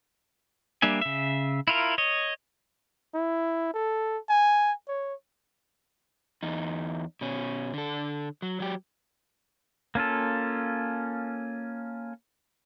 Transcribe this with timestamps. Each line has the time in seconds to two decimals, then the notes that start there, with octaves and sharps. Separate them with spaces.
0.82 G3 A#3 D4 E5 G#5
1.01 C#3 E5
1.68 E4 F4 A#4
1.98 C#5 D#5
3.14 E4
3.74 A4
4.29 G#5
4.88 C#5
6.43 E2 D#4
7.21 B2 C#4
7.74 D3 A4
8.42 F#3
8.60 F#3 G4
9.95 A#3 C#4 F4 A4